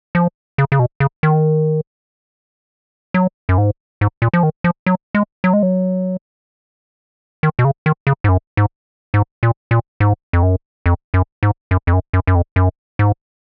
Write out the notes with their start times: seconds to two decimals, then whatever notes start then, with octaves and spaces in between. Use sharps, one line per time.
0.15 F3
0.58 C#3
0.72 C#3
0.79 B2
1.00 C#3
1.23 D#3
3.14 F#3
3.49 F#2
3.58 G#2
4.01 G#2
4.22 A#2
4.34 F3
4.43 D#3
4.64 F3
4.86 F#3
5.15 G#3
5.44 F#3
5.53 G#3
5.63 F#3
7.43 D#3
7.59 B2
7.65 C#3
7.86 D#3
8.07 C#3
8.24 G#2
8.29 F#2
8.57 G#2
9.14 G#2
9.43 A#2
9.71 A#2
10.00 G#2
10.33 F2
10.43 F#2
10.86 F2
11.14 F#2
11.43 G#2
11.71 F#2
11.87 F2
11.93 F#2
12.14 F#2
12.27 F#2
12.35 F2
12.56 F#2
12.99 G#2